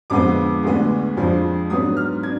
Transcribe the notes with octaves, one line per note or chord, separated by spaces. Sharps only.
F2 D3 F3 G#3 B3 D6
D2 D3 G#3 B3 D4
F2 F3 G#3 D4
G#2 F#3 B3 D4 D#6
F6
D4 G#6